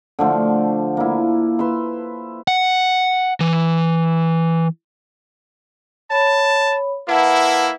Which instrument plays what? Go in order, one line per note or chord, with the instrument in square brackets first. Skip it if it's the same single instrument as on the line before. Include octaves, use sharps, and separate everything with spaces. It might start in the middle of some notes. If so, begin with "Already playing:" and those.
[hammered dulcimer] D3 F3 A3
A#3 E4
B4 E5 C6
[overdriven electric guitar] F#5
E3
[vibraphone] C#5 B5 [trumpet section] A5
[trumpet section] A#3 E4 [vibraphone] B4 F#5 A5